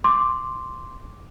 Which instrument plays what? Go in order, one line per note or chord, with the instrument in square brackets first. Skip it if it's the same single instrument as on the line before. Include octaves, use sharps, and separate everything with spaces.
[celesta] C6 D6